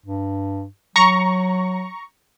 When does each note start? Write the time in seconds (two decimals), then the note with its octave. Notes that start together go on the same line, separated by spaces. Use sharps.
0.06 G2
0.96 F#3 A#5 C#6